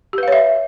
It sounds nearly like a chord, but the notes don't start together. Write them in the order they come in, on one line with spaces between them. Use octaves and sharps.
G4 B4 F5 C#5 E5